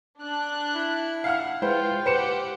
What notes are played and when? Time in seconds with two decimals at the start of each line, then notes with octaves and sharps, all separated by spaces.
0.21 D4 F#6
0.75 E4
1.24 F5 F#5 F6
1.62 G#3 E4 F4 B4 C5 G5
2.06 G4 B4 C5 F#5 C#7 E7